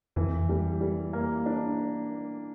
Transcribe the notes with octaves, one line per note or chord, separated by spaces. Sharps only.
F2 E3
G3
G3
A#3
D4